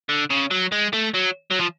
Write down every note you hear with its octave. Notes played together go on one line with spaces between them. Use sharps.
D3
C#3
F#3
G#3
A3
F#3
F#3
F3